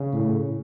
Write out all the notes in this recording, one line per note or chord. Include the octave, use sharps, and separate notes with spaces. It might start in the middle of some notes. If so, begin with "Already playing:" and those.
Already playing: C#3
A2